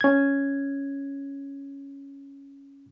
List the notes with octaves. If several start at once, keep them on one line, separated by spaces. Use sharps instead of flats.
C#4 G#6